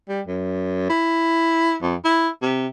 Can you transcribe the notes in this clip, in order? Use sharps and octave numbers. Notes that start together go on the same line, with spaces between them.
G3
F#2
E4
F2
E4
C3